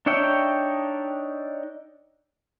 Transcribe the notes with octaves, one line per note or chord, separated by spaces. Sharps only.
D4 D#4 C#5 E5 G5